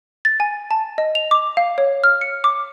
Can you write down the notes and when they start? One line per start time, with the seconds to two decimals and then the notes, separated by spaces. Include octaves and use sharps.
0.25 A6
0.40 G#5
0.71 A5
0.98 D#5
1.15 F7
1.31 D6
1.57 F5
1.78 C#5
2.04 F6
2.21 C#7
2.44 D6